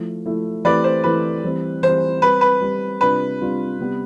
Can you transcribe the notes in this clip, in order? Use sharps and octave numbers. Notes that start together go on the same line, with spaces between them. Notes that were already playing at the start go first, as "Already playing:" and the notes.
Already playing: F3 A3 E4
F3 A3 E4
E3 A3 C4 E4 G4 B4 D5
C5
E3 A3 C4 E4 G4 B4
E3 G3 C4
E3 G3 C4 C5
G3 C4 G4 B4
B4
G3 C4 G4
C3 G3 D4 F4 B4
C3 G3 D4 F4
C3 G3 B3